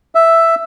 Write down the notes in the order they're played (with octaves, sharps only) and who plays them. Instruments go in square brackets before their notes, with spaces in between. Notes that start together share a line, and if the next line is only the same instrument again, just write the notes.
[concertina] E5